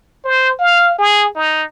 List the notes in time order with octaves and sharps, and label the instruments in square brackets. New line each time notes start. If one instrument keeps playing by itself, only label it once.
[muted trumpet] C5
F5
G#4
D#4